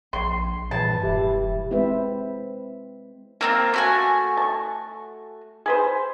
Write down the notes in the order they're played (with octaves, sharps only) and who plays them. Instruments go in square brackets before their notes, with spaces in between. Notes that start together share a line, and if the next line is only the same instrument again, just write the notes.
[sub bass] A#1 [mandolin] C6
[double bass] G2 E3 [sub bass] A#2 [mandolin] A5
[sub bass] E1 [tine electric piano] G4 E5
[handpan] G#3 C4 E4 B4 C5 E5
[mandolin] A#3 C4 F4 [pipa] A#4
[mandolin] A3 F#4 G#5
[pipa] A5 C#6
G#4 B4 C5